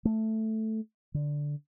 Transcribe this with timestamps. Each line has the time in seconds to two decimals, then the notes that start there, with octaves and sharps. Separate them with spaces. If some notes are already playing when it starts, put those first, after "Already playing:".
0.05 A3
1.14 D3